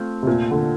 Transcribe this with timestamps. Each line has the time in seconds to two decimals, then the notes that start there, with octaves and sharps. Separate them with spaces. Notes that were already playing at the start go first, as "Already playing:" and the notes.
Already playing: A3 C4 F4
0.23 C3
0.27 A#2
0.51 D3